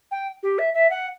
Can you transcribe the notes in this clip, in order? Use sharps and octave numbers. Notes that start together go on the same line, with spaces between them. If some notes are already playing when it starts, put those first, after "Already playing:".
G5
G4
E5
E5
F#5